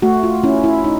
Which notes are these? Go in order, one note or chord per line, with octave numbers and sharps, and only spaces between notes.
A3 F#4
F4
C#4 E4
E4
D#4